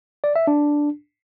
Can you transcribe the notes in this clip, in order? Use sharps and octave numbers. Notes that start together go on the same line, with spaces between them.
D5
E5
D4